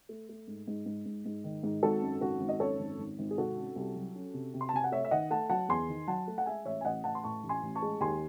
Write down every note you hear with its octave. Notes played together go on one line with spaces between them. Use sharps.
A3
A3
G#2
G#2
G#2
G#2
G#2
D#3
G#2
G#1 F#4 A4
F#2
G#1 F#4 A4
G#1
D#5
F#2 A4 C#5
G#1
G#1
G#1
G#4
C3 F#4 A4
C#4
C2
F#3
C#4
C3
C3
C6
A5
C3 G#5
F#5
A3 C#5 E5
E5
D#3 D#5 F#5
A3 F#5 A5
F#3 F#5 A5
E2 G#5 C6
D#3
F#3 F#5 A5
A3
F#5
G#3 E5 G#5
A1 C#5 E5
G#5
A1 D#5 F#5
A1 F#5 A5
C6
A2 A5 C#6
A1
G#5 C6
A1
A5 C#6
G#3
D#2 G#5 C6